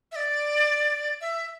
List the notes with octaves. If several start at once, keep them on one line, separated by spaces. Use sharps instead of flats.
E5
D5
E5